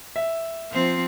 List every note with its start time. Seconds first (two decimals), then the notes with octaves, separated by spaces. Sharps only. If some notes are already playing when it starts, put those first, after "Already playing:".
0.16 E5
0.72 F3 C4